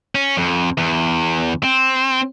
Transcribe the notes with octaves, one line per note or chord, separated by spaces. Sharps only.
C#4
F2
E2
C4